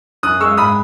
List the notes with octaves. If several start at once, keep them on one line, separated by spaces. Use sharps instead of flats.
F#2 D#6 F#6
G#3 C#6 E6
G#2 B5 D#6